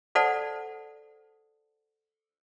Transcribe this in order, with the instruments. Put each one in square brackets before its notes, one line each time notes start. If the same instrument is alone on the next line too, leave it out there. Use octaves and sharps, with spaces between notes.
[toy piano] A4 C5 D5 F#5 A5